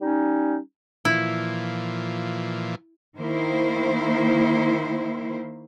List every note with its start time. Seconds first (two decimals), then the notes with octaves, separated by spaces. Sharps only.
0.01 G3 C#4 D#4
1.05 A#2 E3 F3 E4
3.18 D#3 A#3 E4 C5